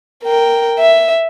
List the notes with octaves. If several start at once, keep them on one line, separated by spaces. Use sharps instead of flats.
A#4 G5
E5